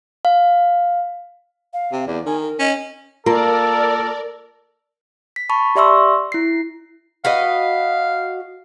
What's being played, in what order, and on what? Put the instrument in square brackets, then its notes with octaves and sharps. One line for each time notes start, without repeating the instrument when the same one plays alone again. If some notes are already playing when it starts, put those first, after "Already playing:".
[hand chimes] F5
[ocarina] F5
[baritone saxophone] C3
[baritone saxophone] E2 [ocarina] D5
[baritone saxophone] D#3 [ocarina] G#5
[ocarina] A#4
[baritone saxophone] C#4 [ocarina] D#5
[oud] A#3 [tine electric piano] F4 [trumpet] A4 [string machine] A#4 D5
[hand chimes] B6
A5 B5 C#6
G4 D5 E5 C6 C#6 E6
E4 C7
[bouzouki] F#4 B4 D#5 [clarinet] F5